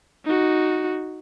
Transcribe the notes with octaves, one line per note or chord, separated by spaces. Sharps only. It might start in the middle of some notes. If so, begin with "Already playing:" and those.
D#4 F#4